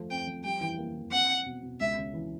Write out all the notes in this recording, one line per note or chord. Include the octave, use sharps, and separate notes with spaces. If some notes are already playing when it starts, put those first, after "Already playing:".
Already playing: F3 A3
C4 G5
F3
G3 G5
E3
A#3
E3
C4 F#5
C4
B2
B2
C#2 E5
C#3
E3